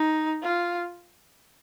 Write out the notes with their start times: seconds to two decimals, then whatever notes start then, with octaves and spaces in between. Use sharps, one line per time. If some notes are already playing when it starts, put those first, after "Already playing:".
Already playing: D#4
0.42 F4